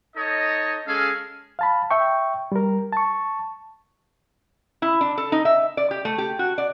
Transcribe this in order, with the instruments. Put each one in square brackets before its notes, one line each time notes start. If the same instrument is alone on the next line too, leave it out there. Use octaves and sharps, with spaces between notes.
[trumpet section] D#4 A4 C#5 D#5
G#3 C#4 G#4 A4 F5
[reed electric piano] F5 A5 B5
E5 G5 C#6
G3 A#4
A5 C#6
[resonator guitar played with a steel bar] E4
D4
A4
D#4
E5
D5
G4
A3
G4
F#4
D5